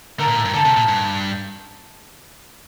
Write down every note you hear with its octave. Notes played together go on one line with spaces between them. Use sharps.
D3 A#4
A#2
A2
G2
D3 A4
C3
A#2
G2